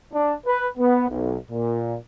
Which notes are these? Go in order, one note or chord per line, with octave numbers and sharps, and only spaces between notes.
D4
B4
B3
B1
A#2